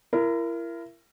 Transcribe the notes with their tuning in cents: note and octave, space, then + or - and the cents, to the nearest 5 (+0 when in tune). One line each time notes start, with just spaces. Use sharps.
E4 +35 A#4 +0